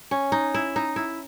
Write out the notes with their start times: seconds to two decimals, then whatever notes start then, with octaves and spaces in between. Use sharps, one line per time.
0.11 C#4
0.32 D#4
0.54 E4
0.76 D#4
0.96 E4